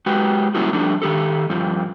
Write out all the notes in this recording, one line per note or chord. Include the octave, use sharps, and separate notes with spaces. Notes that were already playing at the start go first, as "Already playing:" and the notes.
G#3 F#4 G4 B4
F#3 G3 A#3 C#4 E4 F#4
F3 G3 A3 D4
D#3 G4 A4
G2 F3